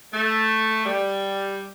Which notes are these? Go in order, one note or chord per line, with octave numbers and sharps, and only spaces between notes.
A3
G3